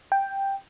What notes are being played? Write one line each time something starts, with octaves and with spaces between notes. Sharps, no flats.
G5